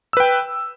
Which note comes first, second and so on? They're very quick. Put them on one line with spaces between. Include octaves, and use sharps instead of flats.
E6 B4 G5